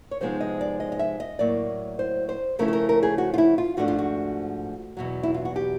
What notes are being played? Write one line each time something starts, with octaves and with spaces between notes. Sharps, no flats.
C#5
C3 F3 G#3 B3 D#4 C5
D#5
D5
D#5
D#5
E5
D#5
A2 F#3 A#3 D5
C5
C5
C#3 F3 A3 C#4 E4 A#4
A4
A#4
A#4
G#4
F#4
F4
E4
F4
G#2 F3 A3 D4 F#4
F4
F#4
E2 B2 F#3
E4
F4
F#4
G4